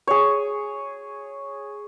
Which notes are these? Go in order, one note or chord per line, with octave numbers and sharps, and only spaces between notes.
G#4 C#5